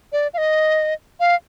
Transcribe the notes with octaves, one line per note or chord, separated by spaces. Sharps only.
D5
F5
D#5
F5